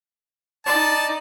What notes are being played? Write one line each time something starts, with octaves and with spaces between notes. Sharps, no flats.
D#4 D5 A5